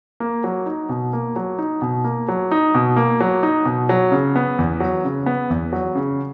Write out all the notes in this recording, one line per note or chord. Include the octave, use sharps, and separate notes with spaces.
A#3
F#3
D#4
B2
A#3
F#3
D#4
B2
A#3
F#3
D#4
B2
A#3
F#3
D#4
B2
F#3
C#3
B3
E2
F#3
C#3
B3
E2
F#3
C#3